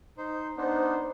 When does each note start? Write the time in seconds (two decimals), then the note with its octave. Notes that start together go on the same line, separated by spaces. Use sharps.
0.18 D#4 C5
0.57 B3 D4 D#4 C5